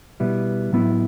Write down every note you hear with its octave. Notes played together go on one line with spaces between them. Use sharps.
B2 G3 B3 E4
A2 F#3 B3 E4